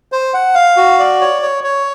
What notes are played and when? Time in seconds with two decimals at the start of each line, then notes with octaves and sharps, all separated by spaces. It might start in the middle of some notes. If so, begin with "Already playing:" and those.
0.12 C5
0.34 F#5
0.55 F5
0.77 F#4
0.99 D5
1.21 C#5
1.42 C#5
1.64 C#5